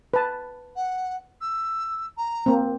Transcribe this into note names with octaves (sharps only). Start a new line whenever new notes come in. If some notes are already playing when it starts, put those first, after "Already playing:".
B4 A5
F#5
E6
A#5
A#3 C4